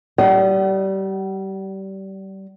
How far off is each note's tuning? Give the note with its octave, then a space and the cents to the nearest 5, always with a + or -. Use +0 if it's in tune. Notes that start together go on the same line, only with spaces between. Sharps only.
G3 -25 D#5 +0 F#5 +45